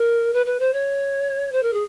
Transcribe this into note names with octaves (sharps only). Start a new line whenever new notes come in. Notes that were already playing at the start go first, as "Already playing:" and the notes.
Already playing: A#4
B4
B4
C5
C#5
C5
A#4
G#4